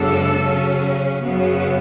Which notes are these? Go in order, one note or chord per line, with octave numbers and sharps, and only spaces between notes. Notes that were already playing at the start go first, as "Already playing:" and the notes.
Already playing: F#2 C#3 G#3 B3 D4 A4
C#3 F#3 C#4
F#2 C#3 F#3 B3